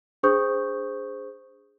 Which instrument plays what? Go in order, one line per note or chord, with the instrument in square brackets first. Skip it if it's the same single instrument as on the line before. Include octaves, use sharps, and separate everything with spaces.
[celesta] D4 G#4 C5 C#6 D#6 G6